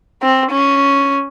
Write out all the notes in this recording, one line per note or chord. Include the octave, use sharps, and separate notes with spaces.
C4
C#4